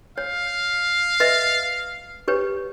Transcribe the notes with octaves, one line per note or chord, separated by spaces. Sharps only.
C#5 F5
B4 D#5 E5
G4 B4 C#5